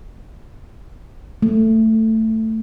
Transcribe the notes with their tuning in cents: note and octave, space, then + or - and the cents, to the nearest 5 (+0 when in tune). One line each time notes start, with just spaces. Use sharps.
A3 +10